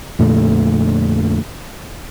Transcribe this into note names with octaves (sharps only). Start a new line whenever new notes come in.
F2 A#2 D3 A3